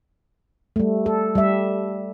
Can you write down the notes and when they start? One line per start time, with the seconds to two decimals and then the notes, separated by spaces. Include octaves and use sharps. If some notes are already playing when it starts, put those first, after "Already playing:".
0.76 G3 A3
1.06 A4
1.35 G3 E5